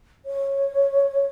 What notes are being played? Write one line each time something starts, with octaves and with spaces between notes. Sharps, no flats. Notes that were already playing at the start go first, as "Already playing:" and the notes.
C#5